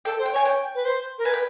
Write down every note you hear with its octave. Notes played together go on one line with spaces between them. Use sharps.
A4 G5
C5
G5
C#5 G#5
G5
B4
C5
A#4
B4 G#5
G5